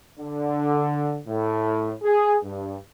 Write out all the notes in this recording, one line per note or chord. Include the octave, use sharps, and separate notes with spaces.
D3
A2
G#4
G2